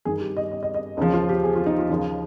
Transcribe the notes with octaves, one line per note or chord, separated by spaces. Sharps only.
G2 D#3 G#4
G4
D#5
D#5
D#5
D#5
D#2 C#3 F3 D#4
F4
G4
G#4
F4
D#4
F4
D#2 C#3 F3 D#4